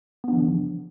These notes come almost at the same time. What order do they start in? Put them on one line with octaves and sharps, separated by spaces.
B3 D4 F3 E3 C#3